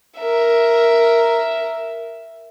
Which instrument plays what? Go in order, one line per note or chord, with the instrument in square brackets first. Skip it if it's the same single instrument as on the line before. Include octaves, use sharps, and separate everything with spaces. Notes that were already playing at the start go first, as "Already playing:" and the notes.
[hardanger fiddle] A#4 E5